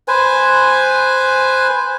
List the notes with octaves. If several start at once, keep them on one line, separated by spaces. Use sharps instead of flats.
B4 C5 G#5